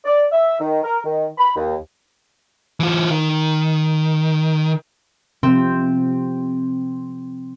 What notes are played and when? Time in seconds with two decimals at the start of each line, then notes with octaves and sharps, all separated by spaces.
0.05 D5
0.32 E5
0.60 D#3
0.83 A#4
1.04 D#3
1.38 B5
1.56 D#2
2.80 E3 F4
3.10 D#3
5.43 C3 F3 C4